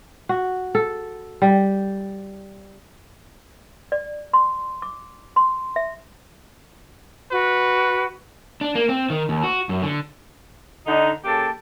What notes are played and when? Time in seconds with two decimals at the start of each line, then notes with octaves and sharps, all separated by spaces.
0.29 F#4
0.75 A4
1.42 G3
3.92 D5
4.33 C6
4.82 D6
5.36 C6
5.76 E5
7.32 F#4 B4
8.61 D4
8.75 A#3
8.89 C4
9.10 D#3
9.29 D#2
9.43 F#4
9.69 F#2
9.83 D3
10.87 D3 D#4
11.25 C#3 A#3 G4 A4 A5